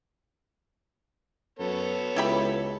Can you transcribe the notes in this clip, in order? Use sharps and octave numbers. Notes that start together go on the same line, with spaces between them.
F#2 B3 A4 C#5
C#2 E4 G4 B5